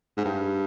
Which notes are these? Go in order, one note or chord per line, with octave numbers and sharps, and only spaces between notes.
G#2
G2